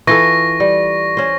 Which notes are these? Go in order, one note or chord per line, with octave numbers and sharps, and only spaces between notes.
E3 F4 A4 C#6 A#6
G3
C#4 C5